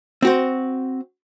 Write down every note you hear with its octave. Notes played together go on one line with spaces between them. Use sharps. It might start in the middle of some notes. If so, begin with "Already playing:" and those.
C4 F#4 C5